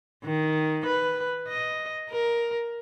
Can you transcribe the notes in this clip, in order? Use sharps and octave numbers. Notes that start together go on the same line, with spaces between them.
D#3
B4
D#5
A#4